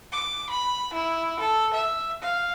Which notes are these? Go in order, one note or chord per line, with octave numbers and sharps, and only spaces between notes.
D6
B5
E4
A4
E5
F5